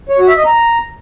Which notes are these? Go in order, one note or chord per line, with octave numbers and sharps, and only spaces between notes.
C#5
F#4
E5
D#5
A#5